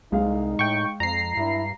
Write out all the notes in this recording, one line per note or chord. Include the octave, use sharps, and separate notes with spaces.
C2 G#3 D#4 F5
A2 G5 C#6
F2 A#5 C7
G2 E4